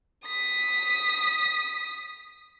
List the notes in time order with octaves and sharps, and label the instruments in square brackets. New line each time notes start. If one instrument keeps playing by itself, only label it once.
[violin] D#6 B6